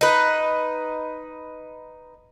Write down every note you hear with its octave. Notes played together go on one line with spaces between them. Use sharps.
D#4 B4